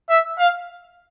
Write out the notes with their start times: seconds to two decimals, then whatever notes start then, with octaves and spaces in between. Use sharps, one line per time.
0.09 E5
0.39 F5